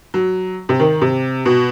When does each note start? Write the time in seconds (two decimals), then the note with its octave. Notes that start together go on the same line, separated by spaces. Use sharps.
0.14 F#3
0.69 C3
0.79 D#3
1.01 C3
1.45 B2